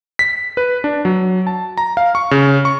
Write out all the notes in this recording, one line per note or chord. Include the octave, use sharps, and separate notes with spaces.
B6
B4
D4
F#3
A5
A#5
F5
C#6
C#3
C#6